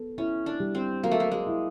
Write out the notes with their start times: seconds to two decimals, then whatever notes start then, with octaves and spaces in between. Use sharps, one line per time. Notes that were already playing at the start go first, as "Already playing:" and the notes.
Already playing: B3 A4
0.18 C#4 E4
0.46 D4
0.60 G3
0.75 C4
1.03 F#3 A#3
1.12 A3
1.20 A#3
1.32 G#3
1.47 E4